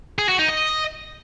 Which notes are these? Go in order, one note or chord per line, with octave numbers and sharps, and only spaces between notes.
G#4
F#4
D#4
D#5